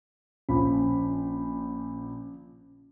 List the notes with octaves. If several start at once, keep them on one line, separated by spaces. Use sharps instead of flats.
A#1 F3 C#4 B5